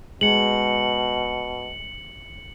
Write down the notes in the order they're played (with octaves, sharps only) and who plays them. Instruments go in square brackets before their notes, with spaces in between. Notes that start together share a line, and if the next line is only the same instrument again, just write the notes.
[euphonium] B2 [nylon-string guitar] G#3 [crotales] C#7 F#7